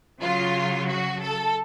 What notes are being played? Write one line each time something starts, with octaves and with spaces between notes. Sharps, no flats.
C#3 F#3 F4
F#4
A4